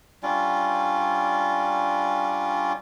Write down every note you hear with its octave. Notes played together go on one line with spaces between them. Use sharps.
G3 C#4 D4 F4